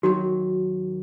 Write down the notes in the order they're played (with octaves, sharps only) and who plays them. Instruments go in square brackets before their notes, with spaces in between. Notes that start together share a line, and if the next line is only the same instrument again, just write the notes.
[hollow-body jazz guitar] D#2 D#3 F#3 [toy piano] F#4